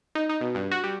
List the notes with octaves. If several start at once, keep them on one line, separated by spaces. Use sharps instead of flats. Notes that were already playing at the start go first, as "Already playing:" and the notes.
D#4
D#4
B2
G2
F#4
G3